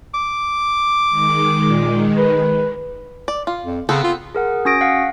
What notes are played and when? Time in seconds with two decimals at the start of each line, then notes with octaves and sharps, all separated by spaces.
0.14 D6
1.09 D#3 G#3
1.65 A#2
2.16 B4
3.28 D5
3.47 F4
3.63 F2
3.89 C#3 B3 C4 A4
4.04 F4
4.35 G#4 A#4 F#5
4.65 C#4 F#4 D#6 A#6 D7
4.81 F5 F#5